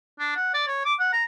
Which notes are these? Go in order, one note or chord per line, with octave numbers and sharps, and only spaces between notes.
D4
F#5
D5
C#5
D6
F#5
A#5